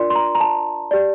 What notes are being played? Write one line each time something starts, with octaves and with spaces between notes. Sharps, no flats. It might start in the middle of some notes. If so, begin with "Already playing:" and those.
Already playing: D4 F4 A#4 D5 C6
C6
A#5
A#5
A5
G4 D5